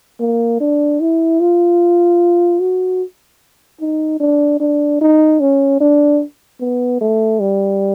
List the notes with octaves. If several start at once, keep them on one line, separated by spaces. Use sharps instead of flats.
A#3
D4
E4
F4
F#4
D#4
D4
D4
D#4
C#4
D4
B3
A3
G3